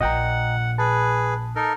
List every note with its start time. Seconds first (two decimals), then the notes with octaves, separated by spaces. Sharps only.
0.01 A#1 A#2 D#5 F#5 G5 A#5
0.78 G#4 B4 A5
1.56 D#4 A4 A#4